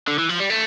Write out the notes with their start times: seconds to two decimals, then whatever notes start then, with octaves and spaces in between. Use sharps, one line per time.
0.08 D3
0.19 E3
0.29 F3
0.40 G3
0.50 A3